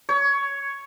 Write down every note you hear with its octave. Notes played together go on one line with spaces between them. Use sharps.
C#5